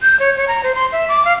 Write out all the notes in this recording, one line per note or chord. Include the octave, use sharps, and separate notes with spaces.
G6
C#5
C#5
A#5
C5
C6
E5
D6
F5